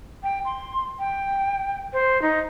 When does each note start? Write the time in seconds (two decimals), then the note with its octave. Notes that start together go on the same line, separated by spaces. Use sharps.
0.23 G5
0.45 C6
0.99 G5
1.93 C5
2.22 D#4